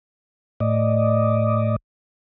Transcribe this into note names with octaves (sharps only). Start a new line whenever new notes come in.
A2 D5 D#5